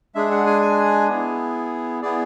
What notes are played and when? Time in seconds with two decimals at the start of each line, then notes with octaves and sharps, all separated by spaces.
0.15 G#3 D4 G#4 E5
0.31 F#5
0.46 G#5
0.62 G#5
1.09 B3 E4 G#4
2.02 B3 E4 G#4 D5